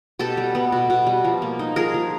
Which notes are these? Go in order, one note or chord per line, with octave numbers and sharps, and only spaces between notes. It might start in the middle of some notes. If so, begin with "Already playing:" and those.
B2 G4 A4
G3
B3
B2
B2
G3
F3
A#3
D#4
F3 G#4 A#4
F3